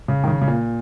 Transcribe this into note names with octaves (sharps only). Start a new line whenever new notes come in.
C#3
D#3
C#3
C#3
A#2